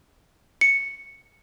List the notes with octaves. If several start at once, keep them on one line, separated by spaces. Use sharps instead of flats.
C#7